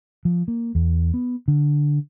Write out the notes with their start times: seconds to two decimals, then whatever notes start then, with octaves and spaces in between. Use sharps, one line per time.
0.25 F3
0.48 A#3
0.75 E2
1.14 B3
1.48 D3